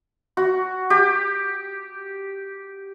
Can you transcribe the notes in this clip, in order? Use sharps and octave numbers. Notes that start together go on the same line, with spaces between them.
F#4
G4